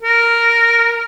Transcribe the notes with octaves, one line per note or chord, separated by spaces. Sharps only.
A#4